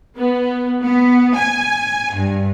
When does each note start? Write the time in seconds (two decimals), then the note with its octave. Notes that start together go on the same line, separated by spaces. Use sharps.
0.17 B3
0.83 B3
1.35 G#5
2.13 G2